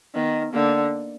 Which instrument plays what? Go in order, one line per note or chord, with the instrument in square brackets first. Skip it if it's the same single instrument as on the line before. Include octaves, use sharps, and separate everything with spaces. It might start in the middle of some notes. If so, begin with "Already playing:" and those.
[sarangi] D#3 [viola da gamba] B3
[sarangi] D3 [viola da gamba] A#3